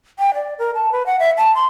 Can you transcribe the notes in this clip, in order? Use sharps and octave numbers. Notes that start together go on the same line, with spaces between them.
G5
D5
A#4
A5
B4
F#5
E5
A5
C6